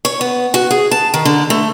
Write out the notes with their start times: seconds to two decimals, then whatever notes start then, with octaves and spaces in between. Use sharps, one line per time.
0.05 C#5
0.21 B3
0.54 F#4
0.71 G#4
0.91 A5
1.14 D#3
1.25 D3
1.50 A3